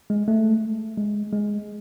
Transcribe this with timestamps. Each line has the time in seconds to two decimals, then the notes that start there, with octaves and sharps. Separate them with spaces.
0.10 G#3
0.28 A3
0.98 G#3
1.32 G#3